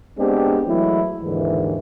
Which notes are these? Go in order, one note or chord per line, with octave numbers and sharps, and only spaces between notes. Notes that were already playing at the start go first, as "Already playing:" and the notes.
G#3 B3 C4 D4 G4
E3 F#3 G#3 A3 E4
D#2 G#2 D3 E3